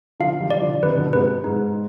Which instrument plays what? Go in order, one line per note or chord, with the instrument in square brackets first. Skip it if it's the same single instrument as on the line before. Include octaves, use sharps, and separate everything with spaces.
[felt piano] D3 F3 [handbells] F5
[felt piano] D#3 G3
[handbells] D5
[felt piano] D3 F3
[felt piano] C3 D#3 [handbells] B4
[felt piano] B2 D3
[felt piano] G#2 C3 [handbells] B4
[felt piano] G#2 [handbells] D#4